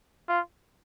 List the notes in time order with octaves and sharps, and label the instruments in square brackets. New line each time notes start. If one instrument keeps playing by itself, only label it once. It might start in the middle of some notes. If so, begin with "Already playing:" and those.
[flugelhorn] F4